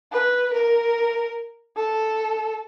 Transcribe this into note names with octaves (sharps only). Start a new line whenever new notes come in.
B4
A#4
A4